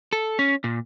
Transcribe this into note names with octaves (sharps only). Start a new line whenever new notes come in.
A4
C#4
A#2